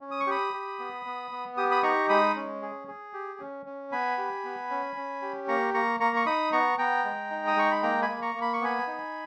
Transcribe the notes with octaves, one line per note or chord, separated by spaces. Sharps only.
C#4
D#6
C#6
G4 B5 D#6
G4
B3
B3
B3
G4 D#6
B5 D#6
D#4 A#5 C#6
G#3 B5 D#6
C#4
G#4
G#4
G4
C#4
C#4
B3 G#5 B5
G4
B3
C#4
C#4
G4
A#3 A#5 C#6
A#3 A#5 C#6
A#3 A#5 C#6
C#6
D#4 B5 D#6
B3 A#5 C#6
B3 G5 A#5
G#3
D#4
D#6
G#3 C#6
B5
A#3 G5 A#5
G#5 B5
A#3
A#5 C#6
A#3
B5
C#6
B3 G#5 B5
D#4